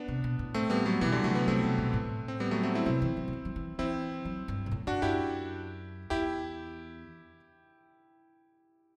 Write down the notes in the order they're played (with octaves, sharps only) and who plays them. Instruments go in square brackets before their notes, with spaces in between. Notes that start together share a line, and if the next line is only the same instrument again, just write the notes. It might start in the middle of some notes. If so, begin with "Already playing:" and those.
Already playing: [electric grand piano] B3 D4
[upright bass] C3
B2
A2
[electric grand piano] A3 C4
G3 B3
F#3 A3
[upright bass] B2 [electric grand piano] E3 G3
[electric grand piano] D3 F#3
[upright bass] C3 [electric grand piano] F#3 A3
[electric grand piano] G3 B3
[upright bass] C3 [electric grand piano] A3 C4
[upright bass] C3
B2
A2
[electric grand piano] C4
G3 B3
F#3 A3
A3 C4
C4 E4
[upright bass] C3 [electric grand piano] C4 E4
[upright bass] E3
F#3
D3
E3
F#3
E3
[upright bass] E3 [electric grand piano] C4 E4
[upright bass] F#3
G2
B2
A2
[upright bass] F#2 [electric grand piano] D4 F#4
[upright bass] F#2 [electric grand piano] E4 G4
[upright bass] E2 [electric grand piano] E4 G4